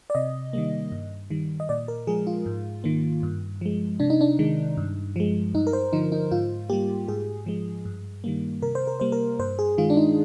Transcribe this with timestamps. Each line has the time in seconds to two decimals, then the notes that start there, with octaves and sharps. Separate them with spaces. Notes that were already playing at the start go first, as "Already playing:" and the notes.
0.10 D5
0.15 C3 D#5
0.53 D#3 G3 A#3
0.92 G2
1.30 D#3 G3
1.60 D#5
1.69 A#2 D5
1.88 A#4
2.07 F3 G#3 G#4
2.27 F4
2.46 G#2
2.84 D#3 A#3
3.23 G2
3.61 F3 G#3
4.00 C3 D4
4.10 D#4
4.21 D4
4.39 D#3 G#3
4.77 G2
5.16 F3 G#3
5.54 G2 D#4
5.67 A#4
5.73 C5
5.93 D3 F3 D#4
6.12 D#4
6.31 G#2 F4
6.69 G3 A#3 G4
7.08 G#2 G#4
7.46 F3 G#3
7.85 G2
8.24 D#3 G3 A#3
8.62 C3 A#4
8.75 C5
8.87 A#4
9.00 G3 A#3 C5
9.12 A#4
9.39 G2 C5
9.59 G#4
9.78 D#3 G#3 F4
9.90 D4
9.97 D#4